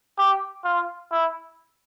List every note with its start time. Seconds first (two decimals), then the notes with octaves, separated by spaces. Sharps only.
0.18 G4
0.64 F4
1.11 E4